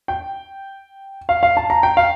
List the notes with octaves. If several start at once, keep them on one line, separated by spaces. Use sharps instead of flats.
G5
F5
F5
A5
A#5
G5
F5